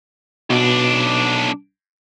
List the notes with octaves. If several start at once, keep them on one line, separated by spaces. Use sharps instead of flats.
B1 B2 D4